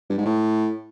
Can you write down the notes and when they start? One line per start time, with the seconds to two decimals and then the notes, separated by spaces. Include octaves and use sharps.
0.10 G2
0.18 G#2
0.25 A2